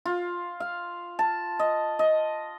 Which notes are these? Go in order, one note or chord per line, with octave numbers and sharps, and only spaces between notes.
F4
F5
A5
D#5
D#5